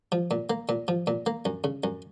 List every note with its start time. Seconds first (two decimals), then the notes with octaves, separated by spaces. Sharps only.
0.12 F3
0.31 A#2
0.50 A#3
0.69 A#2
0.88 F3
1.07 A#2
1.26 A#3
1.45 F#2
1.64 C#3
1.84 F#2